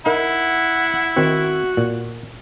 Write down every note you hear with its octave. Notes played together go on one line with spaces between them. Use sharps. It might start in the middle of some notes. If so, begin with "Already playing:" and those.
D#4 E4 A#4 F#5
D#3 C4 F#4
A#2